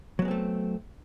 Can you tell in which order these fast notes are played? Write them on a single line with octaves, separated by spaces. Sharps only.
F#3 B3 G#3 C4 A3